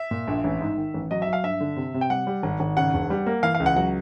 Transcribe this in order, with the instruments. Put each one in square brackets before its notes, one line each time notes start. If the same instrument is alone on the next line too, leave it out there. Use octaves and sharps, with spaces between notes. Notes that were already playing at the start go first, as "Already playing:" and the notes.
Already playing: [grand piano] E5
A#2
A#1
A1
G#2
D#3
A1
F#3 D#5
E5
F#3
F5
G2 E5
D3
C3
C3
G5
G3 F#5
G3
G#1
G#1
C#3 F#5
E1
G3
A#3
E3 F5
F5
C#2
F#5
F#3 F#5